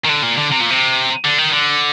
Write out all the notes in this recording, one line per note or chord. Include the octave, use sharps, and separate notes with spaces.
D#3
D3
A#2
D3
C3
A#2
C3
D3
D#3
D3